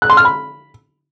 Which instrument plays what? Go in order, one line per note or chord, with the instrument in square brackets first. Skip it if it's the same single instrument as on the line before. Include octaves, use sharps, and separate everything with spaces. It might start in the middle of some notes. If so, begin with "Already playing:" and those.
[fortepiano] F#6
C6
F6
B5